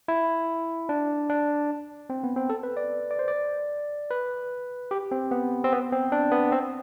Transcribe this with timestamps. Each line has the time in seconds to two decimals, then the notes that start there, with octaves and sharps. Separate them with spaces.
0.08 E4
0.89 D4
1.29 D4
2.10 C4
2.24 B3
2.36 C4
2.50 A4
2.63 B4
2.77 D5
3.11 D5
3.19 C5
3.28 D5
4.11 B4
4.91 G4
5.11 C4
5.31 B3
5.64 C4
5.72 B3
5.92 C4
6.12 D4
6.32 B3
6.52 C4